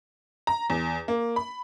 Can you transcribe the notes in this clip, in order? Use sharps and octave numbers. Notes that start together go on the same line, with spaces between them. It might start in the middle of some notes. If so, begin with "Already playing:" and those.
A#5
E2
A#3
B5